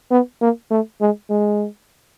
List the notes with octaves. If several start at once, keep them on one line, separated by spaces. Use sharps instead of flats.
B3
A#3
A3
G#3
G#3